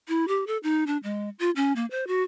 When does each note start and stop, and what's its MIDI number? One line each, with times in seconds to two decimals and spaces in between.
0.08 0.27 64
0.28 0.44 67
0.47 0.57 69
0.63 0.84 63
0.87 0.97 62
1.03 1.29 56
1.39 1.50 65
1.56 1.73 61
1.76 1.86 58
1.91 2.07 72
2.07 2.23 66